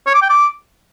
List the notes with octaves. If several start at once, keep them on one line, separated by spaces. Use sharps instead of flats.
C#5
D6
G5
D6